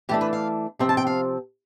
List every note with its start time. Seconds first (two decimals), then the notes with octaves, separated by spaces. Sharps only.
0.09 E3 A3 D4 G4
0.21 B4
0.33 F5
0.79 C3 F3 C4 G5
0.89 A5
0.97 G5
1.07 F5